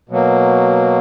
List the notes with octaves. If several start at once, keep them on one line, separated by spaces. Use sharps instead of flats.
B2 F#3 A#3